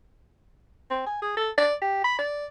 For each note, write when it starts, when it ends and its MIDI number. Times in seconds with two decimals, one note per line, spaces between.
0.91 1.03 60
1.07 1.21 80
1.22 1.34 68
1.37 1.50 69
1.58 1.75 74
1.81 2.04 67
2.04 2.18 83
2.19 2.46 74